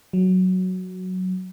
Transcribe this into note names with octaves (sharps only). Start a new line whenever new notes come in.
F#3